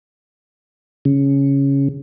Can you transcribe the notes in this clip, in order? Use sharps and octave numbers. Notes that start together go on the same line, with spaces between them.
C#3